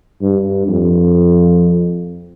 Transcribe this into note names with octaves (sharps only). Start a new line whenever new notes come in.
G2
F2